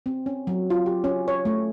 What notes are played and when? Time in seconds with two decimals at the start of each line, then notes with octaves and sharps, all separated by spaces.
0.06 C4
0.26 C#4
0.47 F#3
0.70 F4
0.86 G4
1.04 C#4
1.28 C#5
1.45 A3